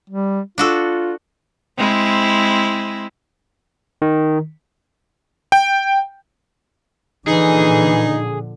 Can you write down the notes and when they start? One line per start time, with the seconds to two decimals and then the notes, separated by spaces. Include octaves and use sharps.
0.10 G3
0.58 D4 F4 F#4 A4
1.77 G#3 C4 E4
4.02 D#3
5.52 G5
7.27 A#2 D3 E3 F3 D#4 G#4